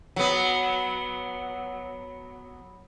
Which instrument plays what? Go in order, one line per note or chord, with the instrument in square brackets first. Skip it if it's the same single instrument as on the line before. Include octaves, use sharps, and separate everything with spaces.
[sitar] F#3 B3